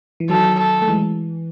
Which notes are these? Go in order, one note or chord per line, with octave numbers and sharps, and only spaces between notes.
E3
D#3 F#3 A4
A4
A3
E3 G#3